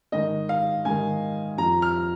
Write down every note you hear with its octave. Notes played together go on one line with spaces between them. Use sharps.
G#2 D#3 D#5
F5
G#2 D#3 G#5
F2 F3 A#5
F6